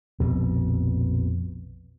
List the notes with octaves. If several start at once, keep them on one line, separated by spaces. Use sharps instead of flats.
A#1 F2 B2